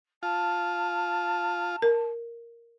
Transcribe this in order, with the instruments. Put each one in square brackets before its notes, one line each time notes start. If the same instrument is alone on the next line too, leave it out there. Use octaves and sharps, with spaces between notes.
[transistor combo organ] F4 [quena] A5
[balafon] A#4